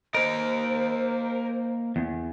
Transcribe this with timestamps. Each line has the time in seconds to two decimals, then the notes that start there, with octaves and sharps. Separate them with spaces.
0.14 A#3 A#4 C5 D#5
1.96 E2